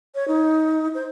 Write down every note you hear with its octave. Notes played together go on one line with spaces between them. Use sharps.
C#5
D#4
C5